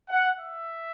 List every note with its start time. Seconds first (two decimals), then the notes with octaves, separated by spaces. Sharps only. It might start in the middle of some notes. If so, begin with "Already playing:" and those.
0.09 F#5
0.40 E5